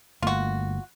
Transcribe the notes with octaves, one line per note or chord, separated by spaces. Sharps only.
G1 A3 A#3 F4 F#4